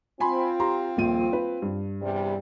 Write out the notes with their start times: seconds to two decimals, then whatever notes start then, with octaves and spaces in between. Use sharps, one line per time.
0.20 C4 F4 G#5 B5 C6
0.60 G4 A#5 C6
0.97 D#1 A#1 D#7
1.33 B4
1.62 G2
2.01 E2 C3 G3